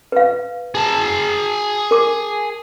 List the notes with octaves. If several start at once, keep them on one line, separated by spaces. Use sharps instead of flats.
B4 F5
G#4 A5
A#4 D6